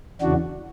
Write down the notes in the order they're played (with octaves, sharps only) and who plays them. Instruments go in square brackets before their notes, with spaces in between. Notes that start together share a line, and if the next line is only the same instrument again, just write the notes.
[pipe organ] E2 C#3 E3 D4 F#4